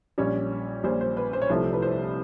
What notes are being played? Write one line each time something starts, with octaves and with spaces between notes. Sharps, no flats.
A#1 A#2 G3 C#4 C#5
A#1 A#2 G3 C5
C5
B4
C5
C#5
C2 C3 F3 A3 C5
B4
C5